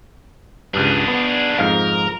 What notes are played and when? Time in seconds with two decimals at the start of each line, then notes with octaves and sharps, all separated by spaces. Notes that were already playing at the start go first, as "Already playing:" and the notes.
0.74 C#2 G2 D4 G#4
1.08 B3
1.58 F2 G#2 A#4 F5